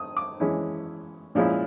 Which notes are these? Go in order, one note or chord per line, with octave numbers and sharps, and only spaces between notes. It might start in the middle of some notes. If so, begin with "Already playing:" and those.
Already playing: D#6
D6
E3 G#3 C#4 E4
A#2 F3 G#3 C#4 E4